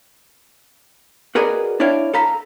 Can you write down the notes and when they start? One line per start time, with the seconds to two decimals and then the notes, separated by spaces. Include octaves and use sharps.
1.35 F#4 G#4 A#4 B4 D5 D#5
1.80 D4 E4 C#5 F5 G5
2.14 A4 F5 A#5 B5